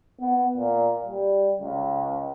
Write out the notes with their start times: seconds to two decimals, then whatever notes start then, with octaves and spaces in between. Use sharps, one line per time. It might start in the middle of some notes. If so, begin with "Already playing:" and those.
0.20 B3
0.57 A#2
1.06 G3
1.61 C#2